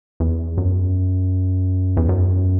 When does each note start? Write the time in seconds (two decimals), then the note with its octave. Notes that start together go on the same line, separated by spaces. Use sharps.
0.20 E2
0.58 F#2
1.97 E2
2.09 F#2